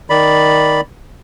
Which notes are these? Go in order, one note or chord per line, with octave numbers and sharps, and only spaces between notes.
D#3 D5 B5